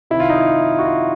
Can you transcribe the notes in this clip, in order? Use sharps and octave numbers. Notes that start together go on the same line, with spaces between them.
C3 D#3 E4
F4
D#4
E4
F#4
F4